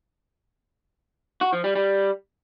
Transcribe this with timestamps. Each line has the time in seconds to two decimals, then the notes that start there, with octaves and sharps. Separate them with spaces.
1.41 F#4
1.53 F3
1.64 G3
1.75 G3